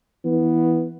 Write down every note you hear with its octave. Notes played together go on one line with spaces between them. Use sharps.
E3 B3